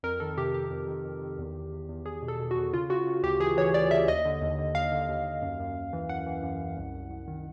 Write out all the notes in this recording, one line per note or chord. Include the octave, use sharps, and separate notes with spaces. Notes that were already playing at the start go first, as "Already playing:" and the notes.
F2 A#4
D#3 A4
C3 G4
C3 G4
F2
D#3
F2
D#3
E2
E2
E2
E2
E2 G#4
B2
A4
B2
F#4
E2
C#3 F4
C#3 F#4
C#3
D2 G4
E3 G#4
E3 C#5
D2 D5
C#3 E5
D#2 D#5
D3
D#2
D3
D#2 F5
D3
D#2
D#2
F#2
F#2
F#2
E3
F#2 F#5
E3
F#2
F#2
C2
C2
C2
D#3